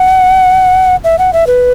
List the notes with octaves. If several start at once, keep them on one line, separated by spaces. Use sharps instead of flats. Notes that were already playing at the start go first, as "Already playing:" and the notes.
Already playing: F#5
E5
F#5
E5
B4